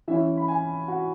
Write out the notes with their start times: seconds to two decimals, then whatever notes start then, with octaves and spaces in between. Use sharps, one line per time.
0.08 E3 C#4 E4 E5
0.37 B5
0.48 G#5
0.88 F#4